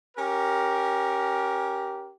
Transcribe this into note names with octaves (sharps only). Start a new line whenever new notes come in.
C#4 G4 A#4